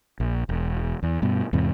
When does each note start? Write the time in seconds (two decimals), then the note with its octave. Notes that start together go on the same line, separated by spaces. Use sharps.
0.20 A#1
0.49 E1
1.03 E2
1.22 G2 B2
1.53 E2 G#2 C3